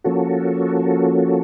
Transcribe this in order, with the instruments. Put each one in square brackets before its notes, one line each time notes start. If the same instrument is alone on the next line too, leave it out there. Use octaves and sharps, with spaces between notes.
[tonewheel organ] F3 A#3 C#4 F#4 A4